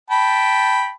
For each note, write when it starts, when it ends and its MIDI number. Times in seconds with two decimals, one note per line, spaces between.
0.10 0.91 79
0.10 0.91 81
0.10 0.91 83